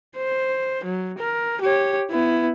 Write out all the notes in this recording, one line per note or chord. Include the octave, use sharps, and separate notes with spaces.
C5
F#3
A#4
G4 C#5
B3 E4